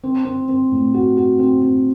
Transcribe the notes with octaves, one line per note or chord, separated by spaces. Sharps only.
C4
C4
C4
A2
F#4
F#4
C4
C4